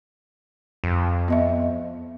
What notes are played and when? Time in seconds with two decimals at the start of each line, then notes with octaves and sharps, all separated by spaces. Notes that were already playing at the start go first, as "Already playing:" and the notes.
0.84 F2
1.28 B3 D#5 E5